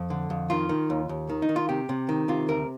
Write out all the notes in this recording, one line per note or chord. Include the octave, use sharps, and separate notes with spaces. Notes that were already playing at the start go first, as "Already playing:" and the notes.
Already playing: F2
D3
F2
D#3 F4
D#3
D#2
D#2
D#3
D#4
D#3
F4
C3 G4
C3
D#3
C3 F4
D2 A#4